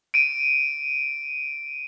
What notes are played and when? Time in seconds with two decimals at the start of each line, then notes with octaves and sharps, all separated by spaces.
0.14 D7 D#7